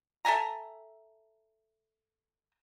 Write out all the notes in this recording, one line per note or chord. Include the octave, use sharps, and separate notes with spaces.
A4 E5 G#5 A#5